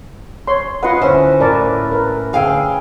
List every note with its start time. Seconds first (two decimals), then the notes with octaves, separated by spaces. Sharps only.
0.48 C#5 C6
0.83 F4 B4 D#5 F#5 C6
1.02 D2 C#4 E4 B4 C5
1.40 A2 A#4 D5 A5
1.91 A#4 B4
2.33 D2 G#4 F5 G5 E6